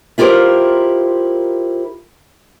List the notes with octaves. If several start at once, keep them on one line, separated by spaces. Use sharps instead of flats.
E4 F4 G4 A4 A#4 C5